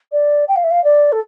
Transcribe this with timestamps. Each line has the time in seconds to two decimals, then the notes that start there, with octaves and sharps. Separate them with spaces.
0.12 D5
0.48 G5
0.56 F5
0.64 E5
0.71 F5
0.84 D5
1.12 A4